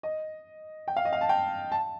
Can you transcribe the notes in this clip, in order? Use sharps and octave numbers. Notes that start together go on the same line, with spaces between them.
D#5
G5
F5
D#5
F5
A5
G5
A5